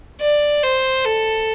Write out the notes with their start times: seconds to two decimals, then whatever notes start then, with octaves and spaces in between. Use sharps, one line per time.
0.21 D5
0.63 C5
1.05 A4